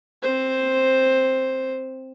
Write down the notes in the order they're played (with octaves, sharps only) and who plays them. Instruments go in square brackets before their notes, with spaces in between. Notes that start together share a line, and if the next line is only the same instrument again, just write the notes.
[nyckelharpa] C4 C5